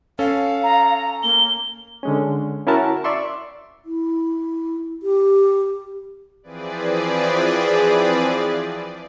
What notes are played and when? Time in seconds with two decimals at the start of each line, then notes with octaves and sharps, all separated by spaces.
0.19 C#4 A4 F5
0.63 A#5
1.23 A#3 G7
2.03 D3 G#3 C#4
2.67 C#4 E4 F#4 A#4 A5
3.04 D5 E5 C6 C#6
3.85 E4
5.03 G4
6.43 E3 F3 C4 G#4 B4 D5